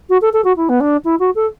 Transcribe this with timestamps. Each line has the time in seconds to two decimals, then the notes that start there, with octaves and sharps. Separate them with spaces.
0.09 F#4
0.21 A4
0.33 A4
0.44 F#4
0.56 E4
0.69 B3
0.80 D4
1.04 E4
1.19 F#4
1.35 A4